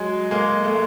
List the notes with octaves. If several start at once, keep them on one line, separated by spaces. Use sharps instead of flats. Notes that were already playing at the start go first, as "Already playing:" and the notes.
Already playing: F#3 G#3
G#3 A#3
A3
G#3